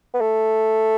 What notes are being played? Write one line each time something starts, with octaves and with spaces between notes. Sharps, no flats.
B3
A3